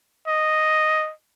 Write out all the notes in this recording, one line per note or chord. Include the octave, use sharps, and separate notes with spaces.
D#5